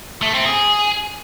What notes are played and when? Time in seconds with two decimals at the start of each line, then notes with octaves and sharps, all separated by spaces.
0.22 A3
0.34 C4
0.46 G#4